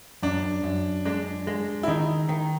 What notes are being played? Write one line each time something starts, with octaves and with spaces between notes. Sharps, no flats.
F#2 D4
F#2
G#3 D4
G#3
E4
D#3 D#4
D#3